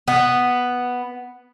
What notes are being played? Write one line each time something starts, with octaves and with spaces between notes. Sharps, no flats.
B3